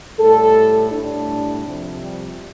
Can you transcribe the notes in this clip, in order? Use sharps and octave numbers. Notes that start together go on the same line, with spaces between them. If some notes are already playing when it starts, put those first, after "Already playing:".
A2 G3 A4
A2 G3 D4
C3 F3
G3